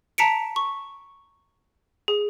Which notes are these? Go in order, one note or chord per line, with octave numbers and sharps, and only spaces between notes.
A5 A#5 B6 C#7 D7
C#6
G#4